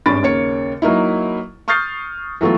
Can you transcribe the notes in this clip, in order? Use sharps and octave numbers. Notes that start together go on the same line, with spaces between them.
G#1 G2 C#4 B5 A6 D7
D#2 C#3 A#3 C#5 C#7
F#3 A#3 D#4 E4
C#6 D#6 F6 G6 A6 C7
E3 F#3 A3 B3 F4